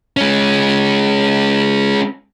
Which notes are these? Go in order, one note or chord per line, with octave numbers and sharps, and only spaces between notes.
G#3 C#4